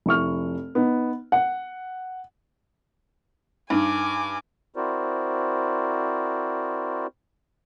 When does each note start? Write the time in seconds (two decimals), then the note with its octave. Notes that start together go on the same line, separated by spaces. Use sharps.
0.06 F1 E4 C#6 F6
0.75 B3 D#4
1.32 F#5
3.70 G2 D#4 G#5 D6
4.76 C4 E4 F#4 A#4 C5 D5